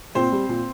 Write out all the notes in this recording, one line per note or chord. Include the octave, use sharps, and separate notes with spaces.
A#2 C4 C5
G3
A#2